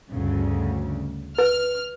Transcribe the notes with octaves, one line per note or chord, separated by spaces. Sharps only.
D2 G2 C#3
B4 F6